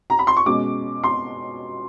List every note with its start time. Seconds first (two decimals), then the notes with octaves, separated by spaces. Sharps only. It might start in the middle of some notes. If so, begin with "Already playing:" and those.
0.10 A#5
0.19 B5
0.27 C6
0.37 C#6
0.46 B2 G#3 C#4 D6
1.04 C6